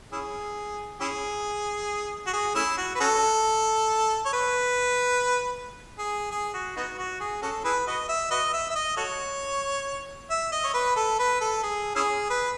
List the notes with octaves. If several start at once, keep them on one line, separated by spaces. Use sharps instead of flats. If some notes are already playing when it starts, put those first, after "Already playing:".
C#4 E4 G#4
C#4 E4 G#4
F#4
G#4
A3 C#4 E4
F#4
B4
C#4 F#4 A4
C#5
B4
G#4
G#4
F#4
B3 D#4 F#4
F#4
G#4
C#4 F#4 A4
E4 G#4 B4
F#4 B4 D#5
E5
F#4 B4 D#5
E5
E5
D#5
F#4 A4 C#5
E5
D#5
C#5
B4
A4
B4
A4
G#4
C#4 E4 G#4
B4